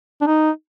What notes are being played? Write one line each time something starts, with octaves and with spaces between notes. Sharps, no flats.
D4
D#4